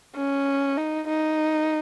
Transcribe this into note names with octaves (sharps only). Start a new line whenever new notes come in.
C#4
D#4
D#4